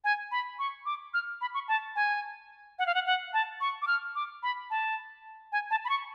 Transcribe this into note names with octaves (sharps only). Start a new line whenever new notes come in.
G#5
B5
C#6
D6
F6
B5
C#6
A5
G#5
F#5
F5
F#5
F#5
A5
C#6
D6
F6
D6
B5
A5
G#5
A5
B5
C#6